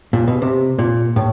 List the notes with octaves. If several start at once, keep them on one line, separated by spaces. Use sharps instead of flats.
A#2
B2
C3
A#2
A2